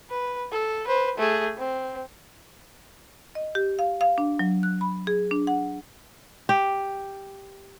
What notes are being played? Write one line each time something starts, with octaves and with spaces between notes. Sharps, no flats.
B4
A4
B4 C5
A3 G#4
C4
D#5
G4
F5
F5
D4
F#3
F#6
B5
G#4
D4
F#5
G4